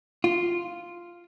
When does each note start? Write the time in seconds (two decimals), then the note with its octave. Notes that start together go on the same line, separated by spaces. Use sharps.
0.24 F4